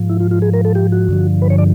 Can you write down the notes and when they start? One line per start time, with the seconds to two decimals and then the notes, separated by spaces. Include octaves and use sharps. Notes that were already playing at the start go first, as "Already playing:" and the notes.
Already playing: G#2 F3
0.09 E4
0.20 F4
0.31 F4
0.42 G#4
0.53 A#4
0.65 A4
0.75 G4
0.92 F#4
1.09 G2 D3 F3
1.42 B4
1.50 C#5
1.58 D5